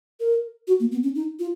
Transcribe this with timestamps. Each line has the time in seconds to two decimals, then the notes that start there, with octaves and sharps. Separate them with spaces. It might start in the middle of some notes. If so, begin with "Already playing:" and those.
0.20 A#4
0.67 F#4
0.80 A#3
0.92 B3
1.03 C#4
1.15 D#4
1.39 F4